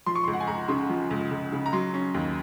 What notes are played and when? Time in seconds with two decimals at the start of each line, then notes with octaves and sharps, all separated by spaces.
0.06 F3 C6
0.15 C#6
0.24 C#2 C6
0.33 F#5
0.40 G#5
0.47 C#2 A#5
0.68 C#3 C6
0.89 F3
1.11 C#2
1.31 C#2
1.52 C#3
1.66 A#5
1.73 F#3 C6
1.94 C#4
2.14 D#2